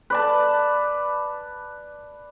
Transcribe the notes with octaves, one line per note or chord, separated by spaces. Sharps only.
B4 D5 A5